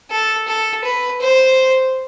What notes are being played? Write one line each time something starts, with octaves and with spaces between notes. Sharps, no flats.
A4
A4
B4
C5